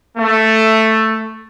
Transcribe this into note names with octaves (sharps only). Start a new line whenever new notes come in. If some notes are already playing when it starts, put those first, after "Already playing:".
A3